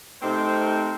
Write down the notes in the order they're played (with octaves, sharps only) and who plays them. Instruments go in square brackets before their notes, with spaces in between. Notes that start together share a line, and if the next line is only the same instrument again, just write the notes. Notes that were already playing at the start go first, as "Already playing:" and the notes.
[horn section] C3 A3 C4 D#4 A#4 C5